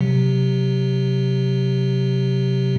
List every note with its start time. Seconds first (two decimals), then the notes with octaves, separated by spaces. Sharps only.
0.01 C3 F#3